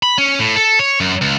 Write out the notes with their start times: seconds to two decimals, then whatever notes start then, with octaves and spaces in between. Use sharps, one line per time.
0.03 B5
0.18 C#4
0.39 A2
0.56 A4
0.79 C#5
1.01 F#2
1.22 C#2